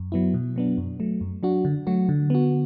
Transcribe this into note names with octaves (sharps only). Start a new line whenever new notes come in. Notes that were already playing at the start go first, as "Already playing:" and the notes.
Already playing: F#2
F#3 B3 E4
B2
F#3 B3 D4
F#2
F#3 A3
F#2
F#3 D4 F#4
D3
F#3 A3 F#4
D3
B3 F#4